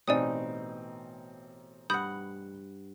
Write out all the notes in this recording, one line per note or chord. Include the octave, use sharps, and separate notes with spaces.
A1 B2 C4 D#4 D5 G#5 D#6
G2 F#5 B5 D#6 G6